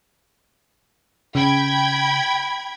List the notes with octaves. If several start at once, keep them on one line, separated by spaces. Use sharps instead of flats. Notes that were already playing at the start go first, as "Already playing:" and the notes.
C#3 G5 B5 G#6